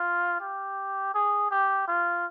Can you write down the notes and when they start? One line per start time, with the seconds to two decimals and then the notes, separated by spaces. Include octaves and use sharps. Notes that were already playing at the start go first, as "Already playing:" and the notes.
Already playing: F4
0.40 G4
1.14 G#4
1.51 G4
1.88 F4